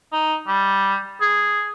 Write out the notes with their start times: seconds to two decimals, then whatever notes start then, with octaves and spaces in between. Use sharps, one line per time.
0.12 D#4
0.47 G3
1.21 G#4